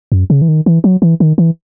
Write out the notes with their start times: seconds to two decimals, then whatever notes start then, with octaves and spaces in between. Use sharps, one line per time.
0.12 F#2
0.30 C#3
0.42 E3
0.48 D#3
0.66 E3
0.84 F#3
1.02 E3
1.20 D#3
1.38 E3